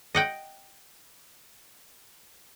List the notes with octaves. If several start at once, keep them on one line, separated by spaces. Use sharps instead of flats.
D#5 F#5 G5